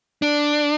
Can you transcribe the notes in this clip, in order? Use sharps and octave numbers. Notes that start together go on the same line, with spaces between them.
D4